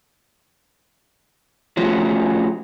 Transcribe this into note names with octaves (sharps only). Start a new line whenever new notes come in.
F3 A3 C#4 F4 F#4